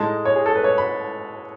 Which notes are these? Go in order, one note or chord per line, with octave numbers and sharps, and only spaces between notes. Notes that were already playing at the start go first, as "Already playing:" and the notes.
Already playing: A2 G#3 D#4 A5
C#5
G#4
A4
B4
C#5
B5